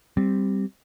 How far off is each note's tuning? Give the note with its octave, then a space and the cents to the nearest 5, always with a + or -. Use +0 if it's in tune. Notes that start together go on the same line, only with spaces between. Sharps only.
G3 +0 C4 +0